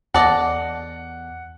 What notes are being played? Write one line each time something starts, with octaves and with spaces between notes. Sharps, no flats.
E2 A4 D5 D#5 F#5